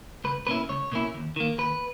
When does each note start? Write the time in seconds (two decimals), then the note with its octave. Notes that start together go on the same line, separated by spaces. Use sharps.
0.24 C#2 B4
0.47 B2 A#3 C#4 E4 B4
0.69 C#2 C#5
0.92 B2 A#3 C#4 E4
1.14 D#2
1.36 D#3 A#3
1.58 D#2 B4